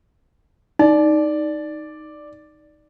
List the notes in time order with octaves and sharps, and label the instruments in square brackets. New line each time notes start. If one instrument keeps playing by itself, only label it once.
[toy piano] D#4 [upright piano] D5